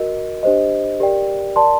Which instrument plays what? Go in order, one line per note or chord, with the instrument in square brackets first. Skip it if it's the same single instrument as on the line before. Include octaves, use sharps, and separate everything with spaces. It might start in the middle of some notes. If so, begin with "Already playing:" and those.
Already playing: [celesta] F#4 A#4 D#5
D4 G4 C5 D#5
G4 A#4 D5 G5
A#4 D5 A5 C6